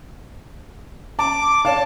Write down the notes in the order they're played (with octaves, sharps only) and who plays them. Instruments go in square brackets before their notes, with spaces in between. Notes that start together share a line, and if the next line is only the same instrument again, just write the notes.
[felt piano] A5 [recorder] D6
[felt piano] C#5 F5 [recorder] A5